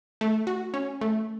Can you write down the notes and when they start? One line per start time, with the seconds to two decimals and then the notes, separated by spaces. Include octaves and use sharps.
0.21 A3
0.47 F#4
0.74 C#4
1.01 A3